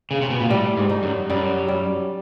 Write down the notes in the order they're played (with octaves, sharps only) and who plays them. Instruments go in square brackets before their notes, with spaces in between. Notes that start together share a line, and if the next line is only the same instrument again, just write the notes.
[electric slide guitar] C#3
C3
B2
A#2
[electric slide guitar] A2 [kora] G3
[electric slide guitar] G#2
[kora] D#4
[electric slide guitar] F#2
[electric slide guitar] F#2 [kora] G3
[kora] G3